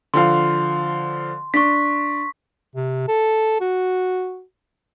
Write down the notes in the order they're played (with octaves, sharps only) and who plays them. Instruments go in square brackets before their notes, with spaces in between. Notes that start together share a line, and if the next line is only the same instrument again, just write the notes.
[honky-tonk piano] D3 F3 F5 [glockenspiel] C6
[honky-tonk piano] D4 [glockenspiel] C#6 B6
[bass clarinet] C3
A4
F#4